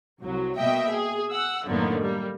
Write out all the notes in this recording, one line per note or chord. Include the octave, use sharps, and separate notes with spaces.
C2 F#3
B2 A#3 D#5 E5 G5
G#4
F#5 E6
F#2 A2 D3 D#3 A#3 B3
G3 A#3